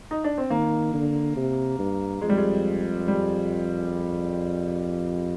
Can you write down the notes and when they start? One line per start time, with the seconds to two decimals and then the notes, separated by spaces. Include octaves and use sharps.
0.11 D#4
0.24 D4
0.38 C4
0.50 D#3 A#3
0.94 D3
1.37 C3
1.79 G2
2.21 F2 G#3
2.29 G3
2.37 G#3
3.08 G3